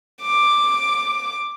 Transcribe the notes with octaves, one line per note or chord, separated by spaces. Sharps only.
D6